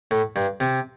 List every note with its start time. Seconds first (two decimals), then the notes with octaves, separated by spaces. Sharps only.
0.11 A2
0.36 G2
0.60 C3